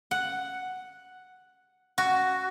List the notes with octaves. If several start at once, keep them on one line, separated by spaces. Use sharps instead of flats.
F#5
F#4